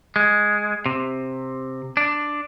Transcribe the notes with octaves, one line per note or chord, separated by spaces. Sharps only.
G#3
C3
D4